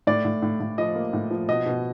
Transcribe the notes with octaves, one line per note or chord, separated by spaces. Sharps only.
A2 D5
A2
A2
A2
F3 D#5
A#3
A2
F3
B2 D#5
B2